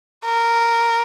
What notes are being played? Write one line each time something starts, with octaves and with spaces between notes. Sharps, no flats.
A#4